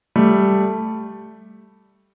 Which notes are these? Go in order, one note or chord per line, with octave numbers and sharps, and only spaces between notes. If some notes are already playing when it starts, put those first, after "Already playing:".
G3 A3